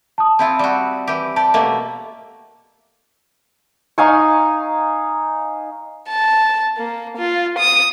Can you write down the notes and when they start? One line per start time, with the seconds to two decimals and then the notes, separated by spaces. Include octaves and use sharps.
0.18 A5 D#6
0.39 C4 E4 F4
0.59 G3 F#4
1.07 E3 G4
1.36 G4 D5 A5
1.54 B2 A3 A#3
3.98 D#4 F5 G#5 C#6
6.09 A5
6.77 A#3
7.17 F4
7.58 D#6